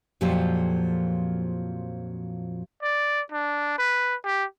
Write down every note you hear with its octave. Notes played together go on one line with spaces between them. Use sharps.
F2 A#2 F3 F#3 G4 A4
D5
D4
B4
G4